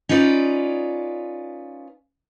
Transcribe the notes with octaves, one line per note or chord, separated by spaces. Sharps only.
C#4 D#4 F4 B4 D5